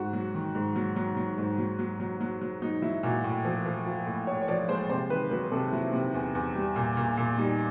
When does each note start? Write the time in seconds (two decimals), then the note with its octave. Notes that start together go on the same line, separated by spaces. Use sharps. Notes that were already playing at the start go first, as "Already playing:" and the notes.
Already playing: G#2 F#4
0.13 F#3
0.34 D#3
0.55 G#2
0.76 F#3
0.96 F#3
1.17 F#3
1.38 G#2
1.58 F#3
1.79 F#3
2.00 F#3
2.21 F#3
2.41 F#3
2.62 F#3 D#4
2.82 F#3 E4
3.03 A#2 F#4
3.24 A2
3.45 F3
3.66 F3
3.86 F3
4.07 A2
4.27 A2 C#5
4.42 C#5
4.48 F3 D5
4.69 G#3 C5
4.89 C3 C5
5.10 D#3 B4
5.31 F#3 B4
5.51 C3 A4
5.72 F#3 E4
5.93 C3
6.14 E2
6.35 E2
6.55 G3
6.76 A#2
6.97 A#2
7.17 A#2
7.38 G3 D#4